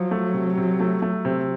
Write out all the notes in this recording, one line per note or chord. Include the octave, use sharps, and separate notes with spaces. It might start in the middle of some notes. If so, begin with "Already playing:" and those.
Already playing: F3 F#3
A3
C3
C3
A3
A3
C3